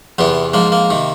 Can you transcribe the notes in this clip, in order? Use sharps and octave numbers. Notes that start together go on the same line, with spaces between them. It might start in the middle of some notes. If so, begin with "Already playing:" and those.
E2 C3 E3 B3
G#2 F3 A#3
A#3
C3 D#3